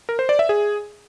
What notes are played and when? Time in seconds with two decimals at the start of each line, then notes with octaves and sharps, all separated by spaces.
0.09 A#4
0.19 C5
0.29 D5
0.39 E5
0.49 G#4